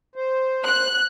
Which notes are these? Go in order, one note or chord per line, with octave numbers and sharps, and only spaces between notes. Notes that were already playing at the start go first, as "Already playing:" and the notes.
C5
F#6